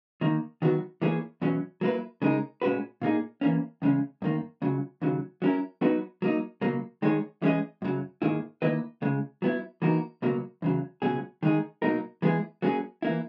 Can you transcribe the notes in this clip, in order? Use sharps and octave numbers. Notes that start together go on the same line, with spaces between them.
D#3 A#3 D#4
D#3 F#3 B3 F#4
E3 A#3 E4 G#4 C#5
E2 B2 F#3 C#4
F#3 A#3 E4 B4
C#3 G#3 D#4 A#4
A#2 G#3 C#4 F#4 B4
A#2 A#3 D#4 G#4
E3 A#3 C#4
E2 C#3 G#3 C#4
F#2 D#3 A#3
C#2 C#3 F#3
D#2 C#3 F#3
F#3 C#4 E4 A#4
F#3 B3 D#4 F#4 B4
F#3 A#3 D#4
C#2 B2 F#3 A#3
D#3 G#3 D#4 G#4 C#5
E3 G#3 C#4 G#4 D#5
F#2 C#3 F#3
G#2 D#3 A#3 E4 G#4
D#3 A#3 E4 B4 D#5
C#2 C#3 G#3
F#3 B3 E4
E3 A#3 D#4 F#4 A#4
C#2 B2 F#3 A#3
E2 C#3 F#3
C#2 B2 F#3 C#4 G#4
D#3 G#3 D#4 G#4
B2 F#3 A#3 D#4 A#4
E3 G#3 B3 E4 G#4
F#3 A#3 C#4 G#4
E3 A#3 E4